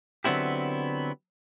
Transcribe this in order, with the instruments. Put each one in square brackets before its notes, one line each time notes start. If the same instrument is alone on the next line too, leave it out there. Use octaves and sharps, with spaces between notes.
[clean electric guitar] D3 F#3 B3 C4 E4 G4